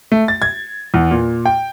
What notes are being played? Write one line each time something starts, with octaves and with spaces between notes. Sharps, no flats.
A3
A6
G#6
E2
A#2
G5